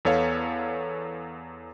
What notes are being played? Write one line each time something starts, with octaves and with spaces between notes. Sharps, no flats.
E2 B3 A4 C#5 F5